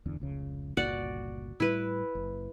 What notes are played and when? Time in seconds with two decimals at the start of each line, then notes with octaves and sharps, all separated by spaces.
0.06 D1 E2 D3
0.20 F1 C#2 C#3
0.77 G1 C#2 A#2 F#4 D5 F#5
1.60 A2 G3 E4 B4
2.15 F#1